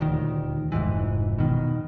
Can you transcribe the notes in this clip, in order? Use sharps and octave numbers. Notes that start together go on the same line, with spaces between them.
D#1 D2 D#3
F1 C2 G#2 E3
B2 D#3